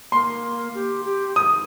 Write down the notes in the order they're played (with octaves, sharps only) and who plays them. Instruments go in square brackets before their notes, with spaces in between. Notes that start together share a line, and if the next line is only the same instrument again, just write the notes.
[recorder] A#3 [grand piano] C6
[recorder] G4
G4
[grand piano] D#6